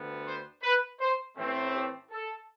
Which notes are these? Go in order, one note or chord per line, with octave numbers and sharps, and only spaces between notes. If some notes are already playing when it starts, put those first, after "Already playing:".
Already playing: D2 D3 G3 B3
C5
B4
C5
A1 A2 E3 A3 C4
G4
A4